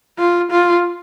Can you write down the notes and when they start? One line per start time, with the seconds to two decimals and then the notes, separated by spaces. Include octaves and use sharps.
0.19 F4
0.51 F4